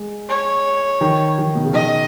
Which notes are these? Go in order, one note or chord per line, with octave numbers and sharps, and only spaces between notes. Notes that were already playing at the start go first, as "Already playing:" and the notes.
Already playing: G#3
C#5
D#3
D#3
B2
C#3
D#3 D#5